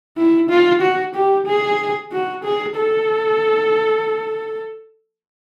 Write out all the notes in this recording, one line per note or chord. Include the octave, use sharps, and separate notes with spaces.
E4
F4
F#4
G4
G#4
F#4
G#4
A4